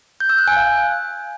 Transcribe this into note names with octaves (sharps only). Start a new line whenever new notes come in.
G6
E6
F#6
G#5
F5